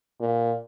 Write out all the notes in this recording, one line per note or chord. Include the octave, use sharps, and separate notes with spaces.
A#2